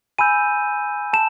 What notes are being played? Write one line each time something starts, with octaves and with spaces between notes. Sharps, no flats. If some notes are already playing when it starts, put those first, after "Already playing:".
G#5 B5 E6 G6 D#7
A5 E7